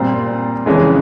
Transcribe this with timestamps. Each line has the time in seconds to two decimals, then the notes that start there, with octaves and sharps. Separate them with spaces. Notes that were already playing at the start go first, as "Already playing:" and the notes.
Already playing: A#2 G3 C4
0.66 F2 C#3 E3 G#3 C#4